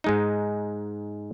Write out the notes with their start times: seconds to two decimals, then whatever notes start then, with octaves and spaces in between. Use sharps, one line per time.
0.04 G#2 G#3 D#4